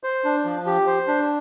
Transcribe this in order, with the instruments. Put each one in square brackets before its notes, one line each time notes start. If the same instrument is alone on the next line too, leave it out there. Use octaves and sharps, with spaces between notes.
[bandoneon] C5
D4
F3
G4
C5
D4